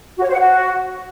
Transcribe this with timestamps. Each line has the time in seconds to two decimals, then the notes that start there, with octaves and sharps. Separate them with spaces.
0.18 F#4
0.23 C#5
0.28 C5
0.34 F#5
0.39 F#4